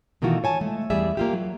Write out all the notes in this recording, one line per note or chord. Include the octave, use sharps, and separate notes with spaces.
B2 D#3 E3 A3 F4 F#4
C#5 G#5 A5
G#3 A3
E2 G3 G#4 D5 E5
A#3 F4 G4
F#3